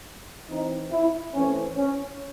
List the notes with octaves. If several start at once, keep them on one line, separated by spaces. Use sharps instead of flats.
E3 C4 D#4
E4
E3 A3 C4 C#4
C#4